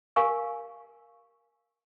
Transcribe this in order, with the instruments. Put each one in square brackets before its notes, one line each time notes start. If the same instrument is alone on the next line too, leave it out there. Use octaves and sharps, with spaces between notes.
[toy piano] G4 A#4 F5 G#5 C#6 E6